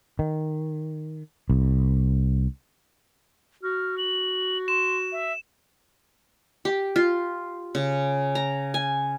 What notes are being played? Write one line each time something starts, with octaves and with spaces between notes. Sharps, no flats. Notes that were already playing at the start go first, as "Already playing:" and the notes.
D#3
C2
F#4 F6
F#7
C6 E7
E5
G4
F4
C#3
A#5
G#5